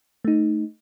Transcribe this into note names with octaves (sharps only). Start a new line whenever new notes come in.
A3 D#4